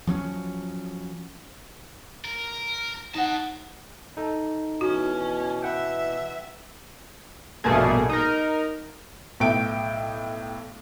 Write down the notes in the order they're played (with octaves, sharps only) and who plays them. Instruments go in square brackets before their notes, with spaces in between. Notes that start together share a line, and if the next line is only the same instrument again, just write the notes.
[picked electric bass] F3 F#3 C4 C#4
[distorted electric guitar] A#4
[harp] D#4 F#5 [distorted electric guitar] D#5 A5
[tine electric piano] D#4 A4
[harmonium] B2 E3 [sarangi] C#4 [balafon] F#4
[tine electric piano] B4 F#5 G5 [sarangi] E5
[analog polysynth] A#1 G2 B2 A3 A#3 G#4
D#4 A#4
[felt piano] B1 A2 E5 G5 D7